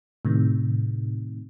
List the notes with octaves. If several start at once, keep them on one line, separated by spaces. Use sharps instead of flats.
A2 C3 D#3